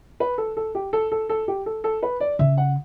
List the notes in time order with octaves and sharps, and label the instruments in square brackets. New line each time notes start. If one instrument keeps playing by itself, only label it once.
[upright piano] B4
A4
A4
G4
A4
A4
A4
G4
A4
A4
B4
D5
[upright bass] C#3 [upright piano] E5
[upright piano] F#5